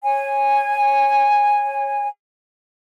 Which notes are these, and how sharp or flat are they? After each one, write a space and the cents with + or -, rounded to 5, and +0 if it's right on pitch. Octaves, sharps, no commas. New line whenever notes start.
C#5 -10 G#5 -10